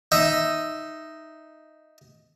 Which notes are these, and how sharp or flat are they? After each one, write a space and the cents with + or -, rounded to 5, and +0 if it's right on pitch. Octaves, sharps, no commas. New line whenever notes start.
D#4 +0 E5 +0